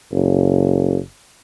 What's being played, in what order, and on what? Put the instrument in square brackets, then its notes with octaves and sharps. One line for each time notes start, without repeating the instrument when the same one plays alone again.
[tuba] F#1